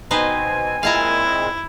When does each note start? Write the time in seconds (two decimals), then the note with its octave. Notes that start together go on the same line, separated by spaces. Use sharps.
0.11 B2 C4 D#4 B4 C5 G#5
0.83 A#2 G#3 C4 E4 F5 A5 A#5